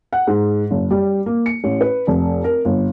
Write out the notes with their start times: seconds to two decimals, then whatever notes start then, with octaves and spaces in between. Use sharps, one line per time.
0.13 F#5
0.27 G#2
0.70 F#1
0.90 G3
1.26 A#3
1.46 C#7
1.64 A1
1.81 B4
2.07 F1
2.44 A#4
2.65 G1